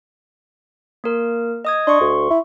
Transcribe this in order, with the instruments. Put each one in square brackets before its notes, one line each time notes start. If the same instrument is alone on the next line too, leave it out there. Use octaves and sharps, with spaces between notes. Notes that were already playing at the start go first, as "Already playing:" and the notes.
[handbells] A#3 A#4
D#5 D#6 G#6
[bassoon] D4 [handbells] C6 C#6
[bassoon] D2
E4